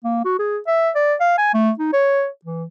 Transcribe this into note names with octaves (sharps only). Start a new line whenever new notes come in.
A#3
F#4
G#4
E5
D5
F5
G#5
A3
D#4
C#5
E3